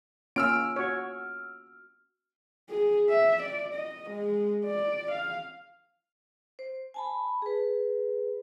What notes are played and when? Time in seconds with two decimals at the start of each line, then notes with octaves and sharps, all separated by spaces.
0.36 A#3 C#4 F4 E6 F6 D7
0.76 F#4 C#5
2.69 G#4
3.09 E5
3.42 D5
3.74 D#5
4.10 G#3
4.65 D5
5.11 F5
6.59 C5
6.94 G#5 A5 B5
7.42 G#4 B4